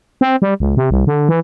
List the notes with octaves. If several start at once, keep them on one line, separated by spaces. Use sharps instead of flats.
C4
G3
C#2
C3
C2
D3
E3